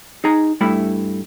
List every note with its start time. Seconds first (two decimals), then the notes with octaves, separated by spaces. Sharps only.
0.24 D#4 G#4 A#5
0.61 G2 A3 E4 B5